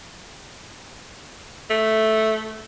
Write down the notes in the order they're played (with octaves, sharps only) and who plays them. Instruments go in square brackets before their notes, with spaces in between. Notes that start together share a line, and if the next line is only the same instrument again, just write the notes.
[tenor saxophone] A3